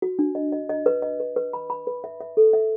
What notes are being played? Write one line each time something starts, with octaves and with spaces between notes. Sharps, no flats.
F#4
D4
D#5
D#5
D#5
B4
D#5
B4
B4
B5
B5
B4
E5
E5
A4
E5